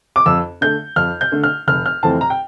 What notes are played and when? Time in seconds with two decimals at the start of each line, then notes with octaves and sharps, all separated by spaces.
0.16 D6
0.26 F2 E6
0.61 D3 A3 G6
0.96 F2 F6
1.21 G6
1.32 D3 A3
1.44 F6
1.67 F1 F6
1.86 F6
2.03 F2 E3 A3 C4 A5
2.21 A#5
2.30 G5